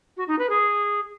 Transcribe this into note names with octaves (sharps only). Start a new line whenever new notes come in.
F#4
D#4
B4
G#4